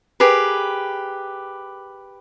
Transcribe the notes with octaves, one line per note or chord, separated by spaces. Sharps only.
G4 G#4 A#4 B4